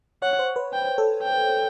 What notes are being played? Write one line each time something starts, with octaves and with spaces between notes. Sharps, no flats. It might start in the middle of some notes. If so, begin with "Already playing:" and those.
C#5 F#5
C5
B4
G5
A4
G5